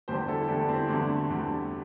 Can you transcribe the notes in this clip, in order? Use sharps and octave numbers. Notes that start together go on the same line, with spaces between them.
E2 D3 G3 G4 C5
E4 A4
A4
E2 D3 G3 D4 G4
C4 E4
E2 D3 G3 A3 D4
E2 D3 G3